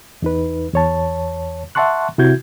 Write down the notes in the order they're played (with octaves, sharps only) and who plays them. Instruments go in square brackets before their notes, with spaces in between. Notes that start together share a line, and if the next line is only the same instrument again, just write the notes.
[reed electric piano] E2 D#4 B4
E2 C#5 A5
E5 F#5 A5 C6 C#6 F#6
C3 E4 F#4 G6 G#6